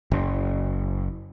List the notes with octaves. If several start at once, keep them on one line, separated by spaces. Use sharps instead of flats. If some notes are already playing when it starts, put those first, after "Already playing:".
F#1